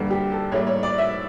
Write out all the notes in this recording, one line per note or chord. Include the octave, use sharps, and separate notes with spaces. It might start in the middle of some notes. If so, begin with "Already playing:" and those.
Already playing: G2 D3 G3 A#3
G4
A4
A2 G3 A#3 C#5
C#5
D5
E5